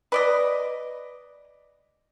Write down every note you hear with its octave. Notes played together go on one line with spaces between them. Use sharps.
B4 D5 D#5